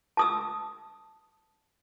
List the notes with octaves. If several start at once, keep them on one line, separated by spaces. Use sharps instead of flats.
A5 D#6 E6